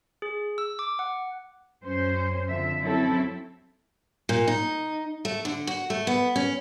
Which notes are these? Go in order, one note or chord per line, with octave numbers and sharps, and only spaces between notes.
G#4
E6
D6
F#5
F#2 C#4 C5
F2 D3 F3 E5
F#3 C4 C#4 E4 A4
A#2
D#4
A3
D3
F#4
A3
B3
C#4